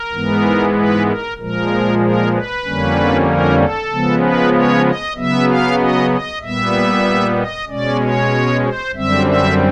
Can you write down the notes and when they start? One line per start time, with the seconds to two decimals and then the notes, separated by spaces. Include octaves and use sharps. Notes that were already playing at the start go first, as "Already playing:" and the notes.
Already playing: A#4
0.11 G#2 E3 G#3 B3
0.75 B4
1.06 A#4
1.38 A#2 F3 G#3 A#4
2.00 A#4
2.32 B4
2.64 F2 D3 G3 A#3 C#4
3.27 A#4
3.59 A4
3.90 C#3 F3 G#3 B3
4.21 B4
4.54 C#5
4.85 D#5
5.16 C#3 F#3 B3 E5
5.47 F5
5.79 D#5
6.10 D#5
6.42 A#2 G3 B3 E5
7.36 D#5
7.68 B2 G#3 C#4 D5
8.00 C#5
8.63 C5
8.95 F#2 D3 G3 C4 E5
9.26 E5